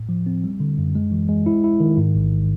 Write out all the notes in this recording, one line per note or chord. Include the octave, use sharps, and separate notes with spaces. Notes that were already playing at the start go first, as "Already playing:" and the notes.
Already playing: A2
F3
C4
G3
D3
F#2
G#3
E3
G#3
E4
E4
D#3
G#2
A1